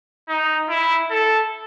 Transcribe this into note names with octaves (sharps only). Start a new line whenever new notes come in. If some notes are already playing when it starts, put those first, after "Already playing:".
D#4
E4
A4